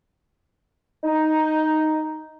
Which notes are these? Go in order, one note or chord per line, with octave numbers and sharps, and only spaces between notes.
D#4